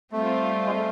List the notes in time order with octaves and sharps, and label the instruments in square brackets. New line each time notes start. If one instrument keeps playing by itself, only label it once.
[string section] G3 C4 F4 [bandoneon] A3
[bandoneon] G#3
A3